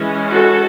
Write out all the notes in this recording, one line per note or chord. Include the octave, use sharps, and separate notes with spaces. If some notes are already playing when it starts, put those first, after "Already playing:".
Already playing: E3 G#3 C#4
F#4 A4